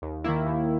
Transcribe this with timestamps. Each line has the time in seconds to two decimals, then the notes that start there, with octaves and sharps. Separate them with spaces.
0.02 D#2
0.24 D#3 A#3 E4
0.46 D#2